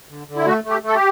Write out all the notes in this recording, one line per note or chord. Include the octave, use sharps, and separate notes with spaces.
D3
D3
E4
A3 F#4
A3
G4
A3
A4
G4